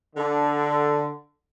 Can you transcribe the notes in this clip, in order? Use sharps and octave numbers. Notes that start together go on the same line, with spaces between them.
D3